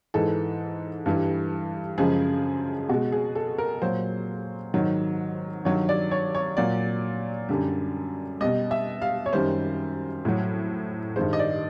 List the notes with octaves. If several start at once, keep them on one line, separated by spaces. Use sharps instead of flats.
G#2 E3 G#3 A4
G2 E3 G3
F#2 C#3 F3 G#3 G#4
B2 G#3 F#4
G#4
A4
A#4
A#2 F#3 C5
G#2 D#3 F#3
G2 D#3 F#3 C#5
D5
C#5
C#5
A#2 F#3 D5
F#2 D3 G3
B2 G3 D#5
E5
F5
C#5
F#2 D#3 G3 C5
A2 F#3
G2 D#3 G#3 C5
D#5
D5